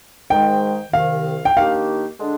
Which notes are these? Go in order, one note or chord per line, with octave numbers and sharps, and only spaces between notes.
G#2 D#3 G#3 D#4 G5
C2 C3 D#3 F5
G5
D#2 D#3 A#3 D4 G4 F5
D3 G#3 D4